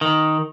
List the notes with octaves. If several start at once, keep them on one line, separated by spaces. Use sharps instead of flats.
D#3